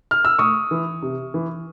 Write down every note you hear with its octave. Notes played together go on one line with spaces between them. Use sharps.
F6
E6
A2 C#6 D#6
E3
C3
E3